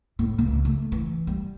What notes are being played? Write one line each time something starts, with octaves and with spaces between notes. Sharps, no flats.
A2
C#2
A3
E3
G3